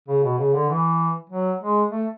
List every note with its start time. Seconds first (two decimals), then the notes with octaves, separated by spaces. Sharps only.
0.09 C#3
0.24 B2
0.38 C#3
0.54 D3
0.69 E3
1.30 F#3
1.61 G#3
1.91 A3